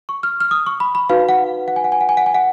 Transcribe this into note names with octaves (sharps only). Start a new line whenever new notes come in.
C#6
F6
F6
D#6
C#6
B5
B5
D#4 F#4 B4 F5
F#5
F#5
G#5
F#5
G#5
F#5
G#5
F#5
G#5
F#5